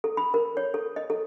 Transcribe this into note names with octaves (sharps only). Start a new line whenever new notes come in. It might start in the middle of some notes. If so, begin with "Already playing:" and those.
A4
B5
A#4
C#5
A4
D#5
A4